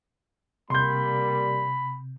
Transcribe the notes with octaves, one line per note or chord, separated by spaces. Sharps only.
C3 G3 A#3 B5 C6 G6